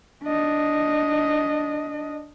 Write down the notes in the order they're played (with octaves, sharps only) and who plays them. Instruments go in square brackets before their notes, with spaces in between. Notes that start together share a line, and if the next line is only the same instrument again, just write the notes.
[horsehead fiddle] D4 D#5